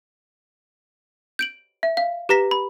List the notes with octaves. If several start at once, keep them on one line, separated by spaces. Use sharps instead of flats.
G6 D7 F#7
E5
F5
G4 B4 A#5 A#6 B6
B5